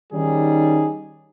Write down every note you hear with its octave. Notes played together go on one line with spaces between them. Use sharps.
D#3 G3 C#4 D#4 G#4